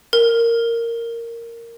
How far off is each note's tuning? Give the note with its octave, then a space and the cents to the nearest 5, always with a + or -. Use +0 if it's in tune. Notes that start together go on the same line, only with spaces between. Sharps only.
A#4 -10